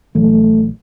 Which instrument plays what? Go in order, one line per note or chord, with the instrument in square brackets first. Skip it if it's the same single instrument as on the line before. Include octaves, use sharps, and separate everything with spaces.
[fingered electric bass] A#1 E3 F#3 [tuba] A3